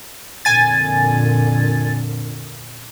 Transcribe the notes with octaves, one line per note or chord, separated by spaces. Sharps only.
F2 A#2 D3 G#5 A6